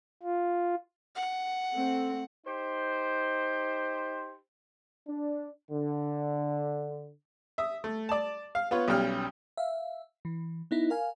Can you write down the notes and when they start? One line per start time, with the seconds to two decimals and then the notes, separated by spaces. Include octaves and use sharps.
0.23 F4
1.15 F#5
1.73 A3 C4
2.46 D#4 G4 C5
5.08 D4
5.71 D3
7.58 E5 D#6
7.84 A3
8.09 D5 A5
8.55 F5
8.71 B3 F4 B4 C#5
8.88 B1 G3 C#4 G5 F6
9.57 E5 F5
10.25 E3
10.71 B3 D#4 E4
10.90 A#4 F5 G#5